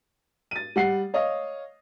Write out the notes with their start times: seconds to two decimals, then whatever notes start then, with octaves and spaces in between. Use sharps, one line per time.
0.51 A6 D#7
0.76 G3 F#5 C7
1.14 C#5 D#5 F5